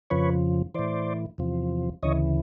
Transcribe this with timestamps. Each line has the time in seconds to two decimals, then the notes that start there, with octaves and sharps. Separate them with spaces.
0.10 F2 C#3 F3 B4 C#5
0.75 A2 E3 C5 D5
1.38 E2 C3 F3
2.03 D2 C#3 E3 C#5 D#5